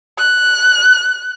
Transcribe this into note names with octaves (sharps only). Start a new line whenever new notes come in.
F#6